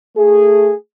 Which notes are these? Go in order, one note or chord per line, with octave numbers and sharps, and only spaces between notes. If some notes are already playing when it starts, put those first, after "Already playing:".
A3 G#4